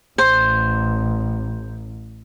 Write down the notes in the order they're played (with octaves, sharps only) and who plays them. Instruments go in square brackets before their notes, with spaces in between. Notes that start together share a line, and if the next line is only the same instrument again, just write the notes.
[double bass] A1 [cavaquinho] C5